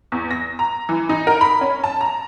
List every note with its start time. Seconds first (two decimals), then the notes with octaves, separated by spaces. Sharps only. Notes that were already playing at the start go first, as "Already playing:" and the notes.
0.12 E2
0.31 A#6
0.59 A#5
0.89 E3
1.09 D#4
1.27 A#4
1.41 B5
1.61 C#4
1.84 A5
2.01 A#5